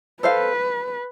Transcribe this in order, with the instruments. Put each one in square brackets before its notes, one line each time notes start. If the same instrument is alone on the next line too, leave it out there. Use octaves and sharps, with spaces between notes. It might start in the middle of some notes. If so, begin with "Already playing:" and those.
[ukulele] A4 C5 F5 [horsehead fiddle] B4